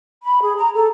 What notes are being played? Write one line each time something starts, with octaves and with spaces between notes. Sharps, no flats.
B5
G#4
A#5
A4